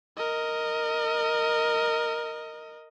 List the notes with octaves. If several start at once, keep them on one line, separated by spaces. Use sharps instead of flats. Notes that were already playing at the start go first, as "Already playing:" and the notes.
A#4 D#5